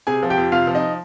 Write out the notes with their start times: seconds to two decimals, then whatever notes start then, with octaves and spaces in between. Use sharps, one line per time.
0.07 C3 G#4 G#5
0.23 F3
0.30 G4 G5
0.37 F2
0.52 C3 F4 F5
0.67 F3
0.75 D#4 D#5